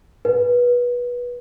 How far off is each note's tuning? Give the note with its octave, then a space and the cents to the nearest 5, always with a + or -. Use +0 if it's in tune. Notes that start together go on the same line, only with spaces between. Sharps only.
B4 -20